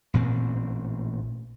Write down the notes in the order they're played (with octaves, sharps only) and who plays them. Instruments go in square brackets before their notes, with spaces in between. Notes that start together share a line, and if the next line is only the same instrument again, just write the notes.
[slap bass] A1 A#2 C4